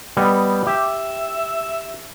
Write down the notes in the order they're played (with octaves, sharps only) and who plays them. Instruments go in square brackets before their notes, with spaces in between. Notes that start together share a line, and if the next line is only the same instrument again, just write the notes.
[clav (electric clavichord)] G3 B3 D#5
[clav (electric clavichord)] G4 [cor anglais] E5